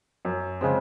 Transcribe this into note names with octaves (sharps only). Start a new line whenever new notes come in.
F#2
C#3 G#3 C4